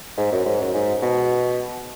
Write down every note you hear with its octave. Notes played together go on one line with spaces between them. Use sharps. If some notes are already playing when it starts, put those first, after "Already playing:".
G#2
F#2
G#2
F#2
G#2
B2